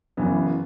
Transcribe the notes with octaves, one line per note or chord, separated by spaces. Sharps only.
F#1 F#2 E3 B3